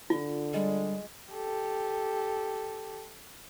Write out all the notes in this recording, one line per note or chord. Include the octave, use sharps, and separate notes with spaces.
D3 F4
G3 G#3
G4 A4